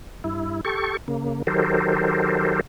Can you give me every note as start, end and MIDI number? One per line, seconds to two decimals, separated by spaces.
0.24 0.61 43
0.24 0.61 64
0.65 0.97 67
0.65 0.97 69
0.65 0.97 85
1.08 1.42 49
1.08 1.42 58
1.47 2.61 51
1.47 2.61 54
1.47 2.61 67
1.47 2.61 69
1.47 2.61 70
1.47 2.61 72